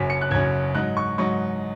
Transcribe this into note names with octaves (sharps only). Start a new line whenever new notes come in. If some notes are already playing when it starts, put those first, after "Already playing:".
Already playing: F#1 F#2 F#3 C#4 B6
C#7
F#6
F#1 F#2 F#3 C#4 G#6
G#2 F#3 D#4 F#6
C#6
G#2 F#3 D#4 C#6